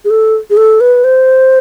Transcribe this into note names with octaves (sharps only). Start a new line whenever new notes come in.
G#4
A4
G#4
A4
B4
C5